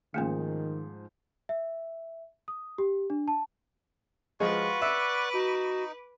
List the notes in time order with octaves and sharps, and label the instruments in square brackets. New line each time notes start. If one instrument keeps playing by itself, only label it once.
[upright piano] G#2 F3 G#4 [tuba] D#3 [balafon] A3 A#3 C#4
[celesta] E5
D#6
G4
D4
A5
[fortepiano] F3 G#3 [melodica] F4 F#4 C#6 [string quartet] B4 D6
[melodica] D5 F#5 C#6 [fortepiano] E5
[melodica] D#4 [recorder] F#4